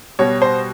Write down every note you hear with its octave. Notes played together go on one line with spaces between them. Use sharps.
B2 G3 C#5
C5